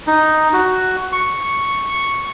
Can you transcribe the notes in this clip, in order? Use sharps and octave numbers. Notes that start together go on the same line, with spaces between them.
D#4
F#4
C#6